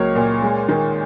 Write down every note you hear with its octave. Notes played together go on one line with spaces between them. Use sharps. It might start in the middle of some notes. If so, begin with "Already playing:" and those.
Already playing: C#2 F#3 A#3 C#5
A#2
G#3
D#3